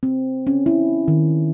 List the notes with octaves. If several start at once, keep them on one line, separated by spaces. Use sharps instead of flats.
C4
C#4
E4
D#3